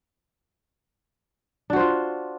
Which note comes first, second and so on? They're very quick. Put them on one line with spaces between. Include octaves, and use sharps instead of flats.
D4 F#4 C5 F4